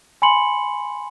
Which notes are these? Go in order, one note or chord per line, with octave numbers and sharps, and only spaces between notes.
G#5 B5 C6 C#7 F#7